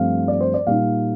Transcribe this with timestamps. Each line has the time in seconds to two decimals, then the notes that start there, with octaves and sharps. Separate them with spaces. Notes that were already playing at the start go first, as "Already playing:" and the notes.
Already playing: G2 F3 A3 C4 F5
0.28 D5
0.41 C5
0.54 D5
0.67 A#2 G3 A#3 D#4 F5